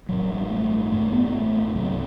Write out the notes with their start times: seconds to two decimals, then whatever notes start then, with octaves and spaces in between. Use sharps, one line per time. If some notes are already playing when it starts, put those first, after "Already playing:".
0.09 A1 G2 F#3
0.29 G3
0.50 A3
0.91 A1 G2 A3
1.12 B3
1.25 B3
1.33 A3
1.75 C2 C3 F#3